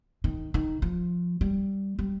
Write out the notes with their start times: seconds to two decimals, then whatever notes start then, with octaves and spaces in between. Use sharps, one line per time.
0.24 D#3
0.54 D#3
0.82 F3
1.41 G3
1.99 G3